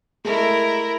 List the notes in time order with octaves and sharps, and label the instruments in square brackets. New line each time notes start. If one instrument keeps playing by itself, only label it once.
[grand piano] G#3 A3 [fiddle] E4 A#4